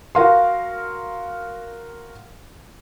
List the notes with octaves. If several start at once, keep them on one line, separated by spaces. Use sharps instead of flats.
F#4 A#4 F5 C6